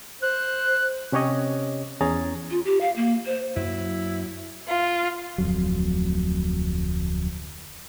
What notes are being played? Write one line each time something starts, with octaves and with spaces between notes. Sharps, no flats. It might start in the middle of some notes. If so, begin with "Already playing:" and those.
C5 F#6
C3 C#4 G4 C#5 D#5
E2 C#4 G#4 A#5 A6
F4
G4
F5
A#3
C5
F#2 F#3 A#3 E4
F4
D1 F2 F#3